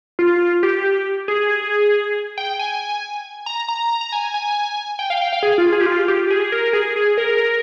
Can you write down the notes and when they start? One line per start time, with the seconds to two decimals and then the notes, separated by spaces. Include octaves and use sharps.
0.19 F4
0.63 G4
1.28 G#4
2.38 G5
2.59 G#5
3.46 A#5
3.69 A#5
4.01 A#5
4.12 G#5
4.34 G#5
4.99 G5
5.10 F5
5.21 G5
5.33 F5
5.43 G#4
5.58 F4
5.72 G#4
5.81 G4
5.86 F4
6.08 G4
6.30 G#4
6.52 A#4
6.73 G#4
6.96 G#4
7.18 A#4